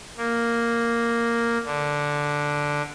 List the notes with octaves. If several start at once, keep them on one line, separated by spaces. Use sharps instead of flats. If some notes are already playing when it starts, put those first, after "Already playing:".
A#3
D3